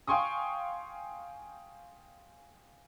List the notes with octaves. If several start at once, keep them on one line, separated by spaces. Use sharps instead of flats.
F5 G5 G#5 C6 C#6 D#6